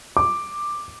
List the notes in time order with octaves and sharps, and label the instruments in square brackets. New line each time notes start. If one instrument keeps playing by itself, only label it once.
[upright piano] D6